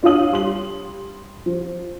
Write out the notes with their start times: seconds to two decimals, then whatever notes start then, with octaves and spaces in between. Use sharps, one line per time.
0.03 D4 F4 C#5 F5 D#6 F#7
0.32 G3 C6 F#7
1.46 F3